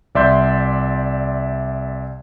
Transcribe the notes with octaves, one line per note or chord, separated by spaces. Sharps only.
C2 D5 E5 C6 G6